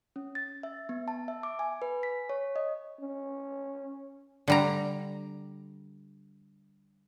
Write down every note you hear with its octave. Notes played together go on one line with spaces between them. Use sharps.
C#4
A6
E5
B3
A5
E5
D6
G#5
B4
B6
C#5
D#5
C#4
D3 G3 A#5